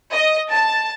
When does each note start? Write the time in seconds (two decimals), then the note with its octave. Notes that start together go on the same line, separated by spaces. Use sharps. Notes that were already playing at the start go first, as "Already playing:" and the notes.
0.13 D#5
0.50 A5